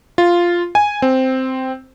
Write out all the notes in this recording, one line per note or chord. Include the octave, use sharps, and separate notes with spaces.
F4
G#5
C4